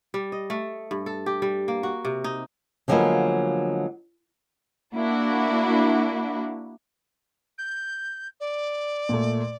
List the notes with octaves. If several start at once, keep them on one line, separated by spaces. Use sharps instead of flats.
G3
D#5
A3
G2
A4
G4
G3
A#3
F#4
C3
D#4
D3 F3 F#3 G#3 A#3 B3
A#3 D4 E4 F#4
G6
D5
A#2 A3